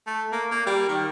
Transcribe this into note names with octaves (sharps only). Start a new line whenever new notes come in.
A3
A#3
A#3
G3
D#3